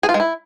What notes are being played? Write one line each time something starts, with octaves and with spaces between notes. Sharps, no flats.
G#4
F4
G#3
E4